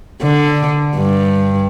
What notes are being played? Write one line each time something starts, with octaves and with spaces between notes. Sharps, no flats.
D3
G2